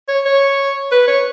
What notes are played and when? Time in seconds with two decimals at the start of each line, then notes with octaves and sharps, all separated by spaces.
0.08 C#5
0.25 C#5
0.91 B4
1.07 C#5